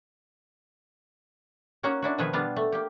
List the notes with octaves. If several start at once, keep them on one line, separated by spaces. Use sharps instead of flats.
A#3 C#4 D#4 F#4 A#5
D4 E4 F#4
B2 D#3 F3 D#4 G#4 B4
G3 B3 D4 F4 F5
A3
A#3 G4